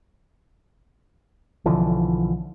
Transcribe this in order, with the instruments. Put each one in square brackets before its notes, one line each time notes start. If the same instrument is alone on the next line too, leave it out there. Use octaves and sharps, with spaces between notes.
[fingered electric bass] B1 D3 E3 F3